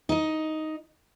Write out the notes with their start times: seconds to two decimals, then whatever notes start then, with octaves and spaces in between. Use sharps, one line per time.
0.09 D#4 D#5